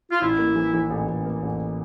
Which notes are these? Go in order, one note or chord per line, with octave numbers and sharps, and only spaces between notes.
F4
A1 E4
A#3
E3
E3
A1
A1
A#3
A1